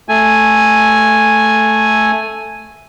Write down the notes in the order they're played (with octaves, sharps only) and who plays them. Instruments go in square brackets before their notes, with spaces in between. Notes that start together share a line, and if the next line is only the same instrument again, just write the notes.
[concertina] A3 G#5